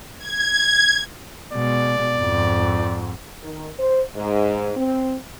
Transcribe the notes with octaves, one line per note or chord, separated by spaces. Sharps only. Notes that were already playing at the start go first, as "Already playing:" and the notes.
G#6
B2 G#3 D5
F2 G#2
D#3
C5
G#2
C4